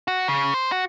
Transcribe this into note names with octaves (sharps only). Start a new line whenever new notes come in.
F#4
C#3
C5
F#4